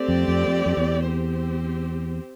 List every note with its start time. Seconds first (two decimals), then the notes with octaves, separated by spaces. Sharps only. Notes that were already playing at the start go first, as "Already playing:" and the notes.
Already playing: A3 C4 G4 D5
0.08 F2
0.28 F2
0.47 F2
0.66 F2
0.77 E2
1.06 C4 G4 C5